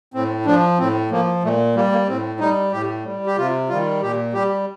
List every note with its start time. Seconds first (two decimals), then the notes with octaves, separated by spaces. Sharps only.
0.14 A2 C4
0.46 F3 D4
0.78 A2 C4
1.11 F3 A#3
1.43 A#2 A3
1.75 G3 A#3
1.92 A#3
2.08 A2 C4
2.40 G3 D#4
2.72 A2 G4
3.04 G3
3.27 G4
3.37 C3 F4
3.69 D#3 G3 F4
4.02 A#2 G4
4.33 G3 G4